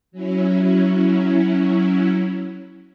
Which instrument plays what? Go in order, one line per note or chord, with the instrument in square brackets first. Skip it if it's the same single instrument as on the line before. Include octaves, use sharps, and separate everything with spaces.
[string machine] F#3 C#4 E4